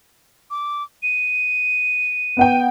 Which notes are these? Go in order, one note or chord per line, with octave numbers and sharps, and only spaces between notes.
D6
D#7
B3 F#5 G5